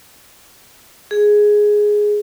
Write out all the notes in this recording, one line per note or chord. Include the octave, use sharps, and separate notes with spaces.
G#4